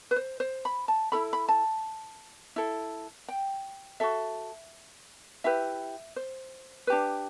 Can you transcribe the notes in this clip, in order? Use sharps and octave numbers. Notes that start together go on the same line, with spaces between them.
B4
C5
C5
B5
A5
E4 A4 B5
B5
A5
E4 A4
G5
F#4 A4 E5
E4 G4 B4 E5
C5
D4 G4 B4